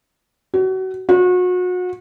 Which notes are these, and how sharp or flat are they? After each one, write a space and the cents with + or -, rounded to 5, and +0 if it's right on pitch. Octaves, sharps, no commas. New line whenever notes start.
F#4 +30
F#4 -35